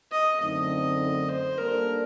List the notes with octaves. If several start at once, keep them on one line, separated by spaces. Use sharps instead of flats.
D#5
F#2 D3 A3 C4 D#4 D#5
C5
G3 A#3 D4 A4 A#4 D5